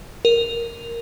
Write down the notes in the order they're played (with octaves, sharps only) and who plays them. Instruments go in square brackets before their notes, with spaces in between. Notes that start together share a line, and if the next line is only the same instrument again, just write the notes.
[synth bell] A#4